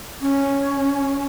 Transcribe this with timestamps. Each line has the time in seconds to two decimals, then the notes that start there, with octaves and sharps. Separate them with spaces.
0.21 C#4